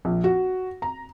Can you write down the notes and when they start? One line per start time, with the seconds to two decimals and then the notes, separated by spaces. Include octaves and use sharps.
0.05 A#1
0.24 F#4
0.82 A#5